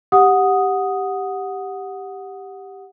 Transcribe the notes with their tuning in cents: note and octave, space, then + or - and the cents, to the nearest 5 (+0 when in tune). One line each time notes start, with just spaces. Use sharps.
G4 +0 F#5 -10 D#6 +0